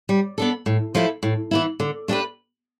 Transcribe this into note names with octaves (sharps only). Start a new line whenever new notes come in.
G3
B3 D4 A4
A2
F3 A3 E4 A4
A2
E3 B3 E4
D3
A3 D4 G4 B4